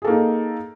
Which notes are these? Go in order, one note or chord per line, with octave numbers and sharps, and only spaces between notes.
A#3 D#4 G#4 A4